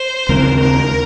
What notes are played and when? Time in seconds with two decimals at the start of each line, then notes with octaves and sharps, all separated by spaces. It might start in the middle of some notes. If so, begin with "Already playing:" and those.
Already playing: C5
0.29 D#2 C#3 G#3 C4 A#4
0.60 A#4